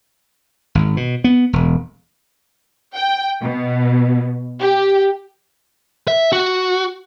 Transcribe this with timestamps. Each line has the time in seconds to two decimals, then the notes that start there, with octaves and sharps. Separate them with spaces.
0.75 G#1
0.97 B2
1.24 B3
1.53 E1
2.94 G5
3.42 B2
4.61 G4
6.08 E5
6.32 F#4